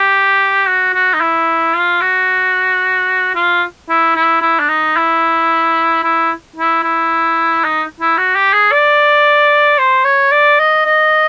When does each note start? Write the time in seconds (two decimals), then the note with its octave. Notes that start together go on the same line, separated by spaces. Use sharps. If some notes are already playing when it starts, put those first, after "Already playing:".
Already playing: G4
0.68 F#4
0.94 F#4
1.14 D#4
1.21 E4
1.75 F4
2.01 F#4
3.35 F4
3.89 E4
4.16 E4
4.42 E4
4.60 D4
4.69 D#4
4.97 E4
6.04 E4
6.56 E4
6.84 E4
7.64 D#4
8.00 E4
8.18 F#4
8.36 G4
8.53 G#4
8.72 D5
9.78 C5
10.05 C#5
10.32 D5
10.59 D#5
10.86 D#5